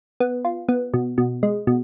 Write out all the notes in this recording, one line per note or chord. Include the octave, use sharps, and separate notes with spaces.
B3
F4
B3
B2
B2
G#3
B2